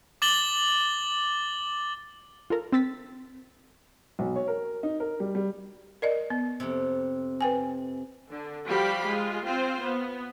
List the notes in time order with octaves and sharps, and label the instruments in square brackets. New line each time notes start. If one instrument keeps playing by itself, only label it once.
[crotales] D6 A6 F#7 G7
[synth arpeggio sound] F4 A4 A#4
C4 E6 A6 B6
[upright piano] B1
C#5
A#4
D#4
A#4
G3
G3
[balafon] A#4 D5 D#5
B3
[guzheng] F2 C3
[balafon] B4 G5 G#5
[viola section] D3
F3 G3 F#4 G4 F5 B5
G#3 F4
C4 F4 C5
B3